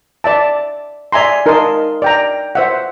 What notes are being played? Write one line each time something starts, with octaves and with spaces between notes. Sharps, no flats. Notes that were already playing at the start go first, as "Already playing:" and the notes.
D5 E5 A5
D5 E5 G#5 A#5 C6
D#4 A#4 D#5 A5 C6 D#6
D5 G5 A#5
C5 E5 F#5